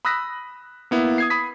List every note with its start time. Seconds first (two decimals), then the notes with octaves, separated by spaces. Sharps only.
0.05 B5 D#6 E6 F#6 A#6 B6
0.91 A#3 B3 E4
1.18 D#6 G#6 C7
1.30 B5 D#6 B6